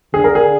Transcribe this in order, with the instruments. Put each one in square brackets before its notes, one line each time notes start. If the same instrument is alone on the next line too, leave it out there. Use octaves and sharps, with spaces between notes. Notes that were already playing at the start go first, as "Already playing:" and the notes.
[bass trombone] D3 [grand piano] G#4
[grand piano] A#4
G#4